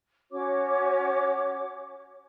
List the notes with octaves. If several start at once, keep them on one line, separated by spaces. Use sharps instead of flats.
C#4 F#4 C#5 D6